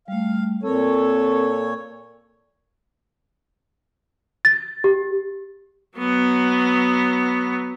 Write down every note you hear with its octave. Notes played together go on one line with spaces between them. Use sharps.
G3 A3 F5
A#2 C4 A4 A#4 C#5
A6
G4
F#3 B3